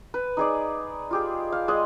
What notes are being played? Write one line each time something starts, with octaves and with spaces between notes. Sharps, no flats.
B4
D#4 G#4 D5
F4 G4 G#4
F5
G#3 D5 D#5